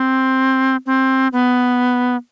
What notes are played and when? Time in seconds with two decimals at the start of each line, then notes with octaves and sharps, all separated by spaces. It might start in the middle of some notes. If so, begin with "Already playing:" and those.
Already playing: C4
0.86 C4
1.33 B3